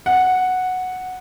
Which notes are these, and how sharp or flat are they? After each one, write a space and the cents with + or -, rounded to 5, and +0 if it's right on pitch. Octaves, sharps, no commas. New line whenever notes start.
F#5 -5